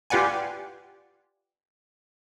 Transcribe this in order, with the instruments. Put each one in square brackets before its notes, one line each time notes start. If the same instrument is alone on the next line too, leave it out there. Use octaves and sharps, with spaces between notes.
[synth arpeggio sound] F4 G4 B4 D5 F#5 G#5